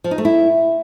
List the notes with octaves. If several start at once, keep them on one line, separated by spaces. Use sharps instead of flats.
F3
D#4
A3
E4